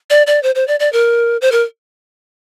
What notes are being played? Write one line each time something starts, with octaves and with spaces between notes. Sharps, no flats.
D5
D5
C5
C5
D5
D5
A#4
C5
A#4